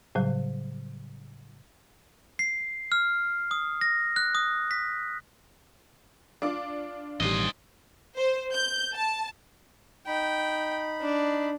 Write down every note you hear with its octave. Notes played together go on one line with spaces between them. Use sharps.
A2 C#3 F#3 G3
C7
F6
D#6
A#6
F#6
D#6
B6
D4 F4 D6
A1 B2 D#3 G3 C5 D#5
C5
G6
A5
D#4 G5 B5
D4